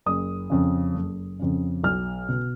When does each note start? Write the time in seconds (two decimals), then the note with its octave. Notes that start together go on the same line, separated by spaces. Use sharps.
0.06 F#1 D#6
0.50 F2 C#3
0.94 F#1
1.39 F2 C#3
1.84 B1 F6
2.29 B2